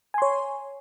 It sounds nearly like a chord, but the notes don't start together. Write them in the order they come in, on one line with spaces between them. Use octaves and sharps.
G#5 C6 C#5